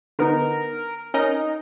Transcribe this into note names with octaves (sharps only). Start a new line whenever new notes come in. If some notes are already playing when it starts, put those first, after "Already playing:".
D3 B3 D#4 A#4
C#4 D#4 A#4 D#5